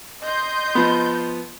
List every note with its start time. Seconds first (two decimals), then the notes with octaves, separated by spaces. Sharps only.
0.22 D#5 C6 G6
0.75 F3 B3